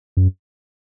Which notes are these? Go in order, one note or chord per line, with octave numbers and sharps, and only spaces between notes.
F#2